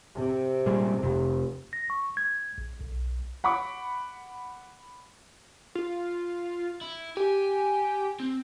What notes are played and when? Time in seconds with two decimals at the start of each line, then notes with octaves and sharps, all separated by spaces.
0.15 C3 C4
0.66 A#2 G3 G#3
1.03 F1 F2 C3
1.73 A#6
1.90 C#6
2.17 G#6
2.58 A#1
2.81 B1
3.44 F#5 B5 C#6 D6
5.75 F4
6.81 E4
7.17 G4 G#5
8.20 C4